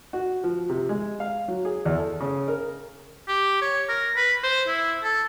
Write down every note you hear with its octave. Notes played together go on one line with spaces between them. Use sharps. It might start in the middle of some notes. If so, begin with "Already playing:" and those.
F#4
F3
C3
G#3
F5
F#3
G#4
E2
A4
C#3
A#4
G4
C#5
A#4
B4
C5
E4
A4